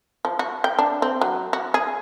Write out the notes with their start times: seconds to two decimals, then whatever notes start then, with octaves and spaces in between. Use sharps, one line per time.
0.25 F3
0.39 F#4
0.64 G5
0.79 D4
1.02 C4
1.21 F#3
1.53 F#4
1.74 G#4